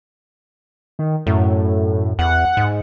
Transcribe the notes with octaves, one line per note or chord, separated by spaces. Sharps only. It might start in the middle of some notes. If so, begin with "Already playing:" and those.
D#3
F#2 A2
E2 F#5
G#2